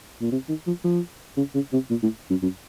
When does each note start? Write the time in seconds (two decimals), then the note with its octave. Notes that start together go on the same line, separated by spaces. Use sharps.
0.21 A#2
0.32 C3
0.49 D#3
0.67 F3
0.84 F3
1.37 C#3
1.55 C#3
1.73 C3
1.90 A#2
2.03 A2
2.30 F#2
2.42 F#2